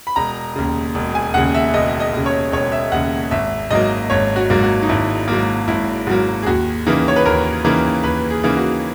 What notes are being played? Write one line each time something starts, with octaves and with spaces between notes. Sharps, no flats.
B5
E1 A#5
D#2 C#3
E1
G#5
D#2 C#3 F#5
E5
E1 D#5
D#5
D#2 C#3
C#5
E1 C#5
E5
D#2 C#3 F#5
G#1 E5
G#2 F#3 A#3 D#5
G#1 C#5
F#4
G#2 F#3 A#3
F#4
D#4
G#1 E4
G#2 F#3 A#3
G#1 E4
G#2 F#3 A#3 F#4
G#4
D#2 F#4
C#3 E3 A#3 D#4
C#5
B4
D#2 A#4
C#3 E3 A#3 D#4
D#2 B4
G#4
C#3 E3 A#3 D#4
F#4